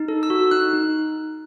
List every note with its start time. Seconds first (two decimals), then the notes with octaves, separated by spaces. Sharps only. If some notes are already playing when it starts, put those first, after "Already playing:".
Already playing: D#4
0.08 A4
0.23 E6
0.30 F#4
0.51 D#4 F#6
0.73 D#4